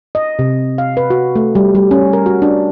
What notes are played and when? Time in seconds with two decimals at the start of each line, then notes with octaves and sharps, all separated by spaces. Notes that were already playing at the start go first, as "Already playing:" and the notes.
0.15 D#5
0.39 C3
0.78 F5
0.97 B4
1.10 F#4
1.36 A3
1.55 G3
1.75 G3
1.91 C#4
2.13 A#4
2.26 F#4
2.42 D4